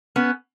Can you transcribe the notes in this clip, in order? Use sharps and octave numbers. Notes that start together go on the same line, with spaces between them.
B3 C#4